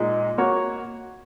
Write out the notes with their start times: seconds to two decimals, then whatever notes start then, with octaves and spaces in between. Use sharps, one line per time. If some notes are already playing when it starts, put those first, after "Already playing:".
Already playing: A#2 G#3 D#4
0.38 A#3 F#4 C#5